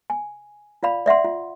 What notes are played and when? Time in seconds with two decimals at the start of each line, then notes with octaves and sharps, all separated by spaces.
0.10 G#5
0.83 F4 D5 F5 B5
1.06 D5 E5 F#5 C6
1.24 F4